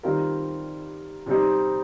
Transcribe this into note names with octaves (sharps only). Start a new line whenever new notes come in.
D#3 G3 C4 F4 A#4
C3 G3 C4 D#4